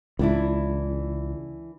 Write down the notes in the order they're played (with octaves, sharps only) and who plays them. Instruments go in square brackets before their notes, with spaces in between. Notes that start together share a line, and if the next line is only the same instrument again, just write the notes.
[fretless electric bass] C#2 [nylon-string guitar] E3 D4 E4